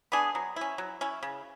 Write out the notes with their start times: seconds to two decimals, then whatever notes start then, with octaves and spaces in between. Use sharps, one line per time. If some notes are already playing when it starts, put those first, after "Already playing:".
0.12 B3 D4 G#4
0.35 F#3
0.56 C#4 E4
0.78 F#3
1.01 C#4 E4
1.23 C#3